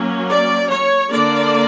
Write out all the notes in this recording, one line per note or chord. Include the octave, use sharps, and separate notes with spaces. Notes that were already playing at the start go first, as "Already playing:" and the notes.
Already playing: F#3 A#3 C#4
D5
C#5
D3 A#3 D4 D5